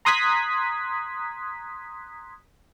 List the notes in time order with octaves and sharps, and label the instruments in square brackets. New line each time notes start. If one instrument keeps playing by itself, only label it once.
[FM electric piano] A#5 C6 D#6 F#6 G#6 B6